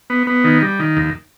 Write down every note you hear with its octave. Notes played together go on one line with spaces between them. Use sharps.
B3
B3
D#3
G3
D#3
D#2